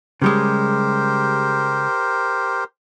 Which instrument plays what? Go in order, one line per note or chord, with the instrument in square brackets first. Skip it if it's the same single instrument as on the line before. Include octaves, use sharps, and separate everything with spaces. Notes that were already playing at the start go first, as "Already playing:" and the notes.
[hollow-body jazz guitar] C#3 G3 G#3 [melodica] G4 A#4 C5